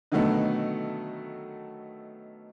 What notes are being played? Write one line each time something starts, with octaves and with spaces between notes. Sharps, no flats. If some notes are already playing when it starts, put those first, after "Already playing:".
B2 D3 D#3 F#3 A3 B3